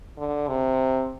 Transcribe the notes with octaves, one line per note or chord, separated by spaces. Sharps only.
D3
C3